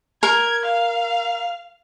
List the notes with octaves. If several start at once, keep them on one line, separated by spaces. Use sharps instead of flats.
A#4 G#6
F5